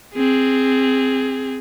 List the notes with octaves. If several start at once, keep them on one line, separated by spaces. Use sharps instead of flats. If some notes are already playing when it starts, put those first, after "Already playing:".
C4 G#4